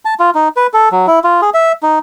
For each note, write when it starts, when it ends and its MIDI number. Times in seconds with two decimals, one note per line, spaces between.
0.05 0.14 81
0.20 0.30 65
0.35 0.48 63
0.56 0.67 71
0.74 0.89 69
0.92 1.06 54
1.07 1.19 64
1.24 1.41 65
1.42 1.50 68
1.54 1.72 76
1.83 1.99 63